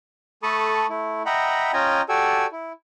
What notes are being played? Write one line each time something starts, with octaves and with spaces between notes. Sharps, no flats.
A3 A4 A5 B5 C#6 D#6
A3 E4
D#5 E5 F#5 G5 A#5 B5
C#4 F4 D#5 G5 G#5 A#5
F#4 G4 A4 D5 G#5 E6
E4